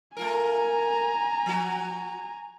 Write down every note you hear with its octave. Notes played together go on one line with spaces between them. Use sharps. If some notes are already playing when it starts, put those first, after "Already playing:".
A3 F4 A#4 G#5 A#5
F3 F#4